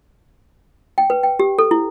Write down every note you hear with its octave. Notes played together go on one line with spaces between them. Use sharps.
G5
B4
G5
G4
A4
E4